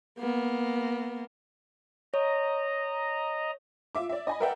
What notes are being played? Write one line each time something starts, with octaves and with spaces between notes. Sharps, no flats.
A#3 B3
C#5 D#5 A#5
F4 E5 D6
D5 E5
D#5 G#5 B5
A#4 B4 D5 E5 F#5 G5